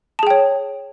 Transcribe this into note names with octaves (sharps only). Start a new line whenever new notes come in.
G#4 C#5 G5 A5